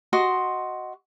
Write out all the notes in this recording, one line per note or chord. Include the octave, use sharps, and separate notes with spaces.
F#4 D#5 C6